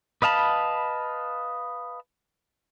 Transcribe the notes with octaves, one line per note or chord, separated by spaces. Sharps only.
B4 D#5 F5 A5 B5